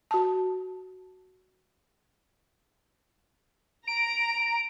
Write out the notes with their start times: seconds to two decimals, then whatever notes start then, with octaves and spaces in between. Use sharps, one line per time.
0.11 F#4 A5
3.88 A#5 D7